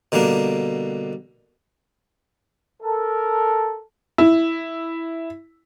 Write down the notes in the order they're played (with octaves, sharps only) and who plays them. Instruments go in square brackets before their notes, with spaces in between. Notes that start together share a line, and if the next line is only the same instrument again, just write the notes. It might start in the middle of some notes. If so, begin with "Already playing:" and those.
[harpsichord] B2 D3 G3 A#3 D4
[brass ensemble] A4 A#4
[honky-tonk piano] E4